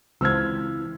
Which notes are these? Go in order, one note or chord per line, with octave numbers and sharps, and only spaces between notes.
C#2 E3 C4 F4 E6 F6 G#6